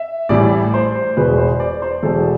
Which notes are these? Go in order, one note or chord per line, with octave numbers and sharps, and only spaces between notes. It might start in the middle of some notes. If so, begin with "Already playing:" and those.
Already playing: E5
A1 A2 G3 D5
C5
E1 E2 B2 B4
C5
D5
C5
E1 E2 B2 A4